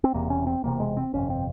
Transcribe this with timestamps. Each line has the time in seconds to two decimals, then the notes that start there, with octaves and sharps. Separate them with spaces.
0.04 C4
0.14 E1 E2 C3 A#3
0.30 C#4
0.47 C4
0.64 E1 E2 C3 A#3
0.80 G#3
0.97 C4
1.13 G1 F2 C3 C#4
1.30 C4